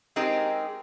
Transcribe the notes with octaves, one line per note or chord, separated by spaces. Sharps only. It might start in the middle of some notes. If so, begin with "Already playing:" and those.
G#3 C4 D#4 G4 G#4 A#4